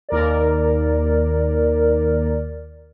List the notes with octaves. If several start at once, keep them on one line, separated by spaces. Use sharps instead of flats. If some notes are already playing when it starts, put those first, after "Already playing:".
D#2 A#4 D5